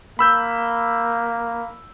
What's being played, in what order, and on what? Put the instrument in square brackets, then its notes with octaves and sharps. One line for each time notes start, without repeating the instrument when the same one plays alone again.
[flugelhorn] A#3 [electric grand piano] B5 E6 G6